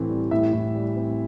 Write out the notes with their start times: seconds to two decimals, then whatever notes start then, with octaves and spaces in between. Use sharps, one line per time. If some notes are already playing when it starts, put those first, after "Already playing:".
Already playing: A2 E3 A3 C4
0.10 G3
0.31 A2 E5
0.53 A2
0.75 G3
0.96 C4